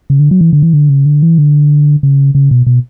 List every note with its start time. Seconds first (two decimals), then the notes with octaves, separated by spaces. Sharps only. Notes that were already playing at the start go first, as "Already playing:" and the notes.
0.10 C#3
0.19 D3
0.31 F#3
0.41 E3
0.53 D3
0.62 E3
0.73 D3
0.89 C#3
1.06 D3
1.23 E3
1.38 D3
2.03 C#3
2.35 C#3
2.51 B2
2.67 B2